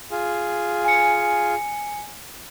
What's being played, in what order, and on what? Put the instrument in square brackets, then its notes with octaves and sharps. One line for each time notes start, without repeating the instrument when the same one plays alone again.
[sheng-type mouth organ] F4 G#4
[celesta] G#5 C#7